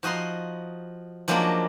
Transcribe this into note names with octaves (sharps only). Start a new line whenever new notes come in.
F3 F#4 D#5 A#5 C6
F3 F#3 G#3 A#3 C#4 D4